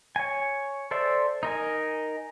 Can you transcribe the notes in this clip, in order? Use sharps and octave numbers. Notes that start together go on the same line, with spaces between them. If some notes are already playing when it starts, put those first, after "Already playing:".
C#5 G#5
A4 C5 D5 E5
D#4 A#4 G#5